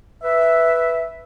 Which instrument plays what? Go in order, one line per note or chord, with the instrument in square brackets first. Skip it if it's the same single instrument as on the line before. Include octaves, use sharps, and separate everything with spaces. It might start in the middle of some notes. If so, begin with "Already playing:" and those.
[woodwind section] B4 E5